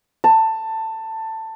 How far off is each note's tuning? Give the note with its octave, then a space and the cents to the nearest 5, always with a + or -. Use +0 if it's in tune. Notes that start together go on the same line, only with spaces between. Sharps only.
A5 +15